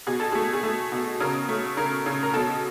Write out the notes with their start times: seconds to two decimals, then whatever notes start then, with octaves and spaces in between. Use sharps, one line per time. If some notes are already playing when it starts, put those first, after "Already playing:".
0.07 B2 G#4
0.20 A4
0.32 A3 G#4
0.53 G#4
0.63 A3 A4
0.92 B2
1.20 C#3 A#4
1.49 A3
1.77 C#3 A#4
2.06 C#3
2.23 A#4
2.34 B2 A4